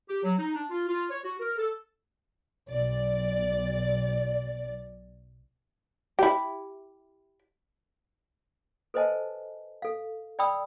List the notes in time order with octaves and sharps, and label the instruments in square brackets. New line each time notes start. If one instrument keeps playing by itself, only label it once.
[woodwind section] G4
F#3
D#4
D4
F4
F4
C#5
F#4
A#4
A4
[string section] B1 D5
[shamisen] E4 G4
[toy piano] A4 B4 C5 D#5 G#5 A5
A4 F5
D5 G5 B5 D#6 E6